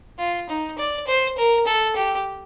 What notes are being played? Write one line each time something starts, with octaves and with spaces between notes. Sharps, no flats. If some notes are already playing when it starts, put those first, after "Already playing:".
F4
D#4
D5
C5
A#4
A4
G4